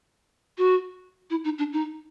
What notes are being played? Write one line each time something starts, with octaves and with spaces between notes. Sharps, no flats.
F#4
E4
D#4
D4
D#4